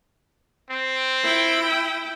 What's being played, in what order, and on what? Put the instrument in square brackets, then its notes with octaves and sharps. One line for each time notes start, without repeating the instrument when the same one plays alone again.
[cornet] C4
[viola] E4 G5